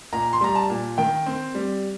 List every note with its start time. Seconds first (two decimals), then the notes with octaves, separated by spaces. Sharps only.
0.13 A#2 A#5
0.33 C6
0.41 G3 A#5
0.55 A5
0.70 A#2
0.98 D#3 G5
1.26 C4
1.55 G3